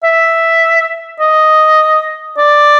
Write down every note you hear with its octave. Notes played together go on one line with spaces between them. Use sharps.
E5
D#5
D5